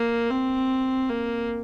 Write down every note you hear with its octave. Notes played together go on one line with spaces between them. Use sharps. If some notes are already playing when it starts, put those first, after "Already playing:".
Already playing: A#3
C4
A#3